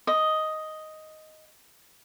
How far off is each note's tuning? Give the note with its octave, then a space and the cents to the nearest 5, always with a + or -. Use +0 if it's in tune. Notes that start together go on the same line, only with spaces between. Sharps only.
D#5 +5